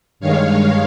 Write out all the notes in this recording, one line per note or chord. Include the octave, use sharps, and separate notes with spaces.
G2 D#3 G#3 C#5 F5